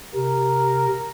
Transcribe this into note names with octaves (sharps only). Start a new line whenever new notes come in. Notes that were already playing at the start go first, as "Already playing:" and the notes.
C3 A#4